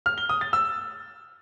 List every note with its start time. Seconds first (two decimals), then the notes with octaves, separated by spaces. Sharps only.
0.06 F6
0.18 G7
0.29 D#6
0.41 A6
0.53 E6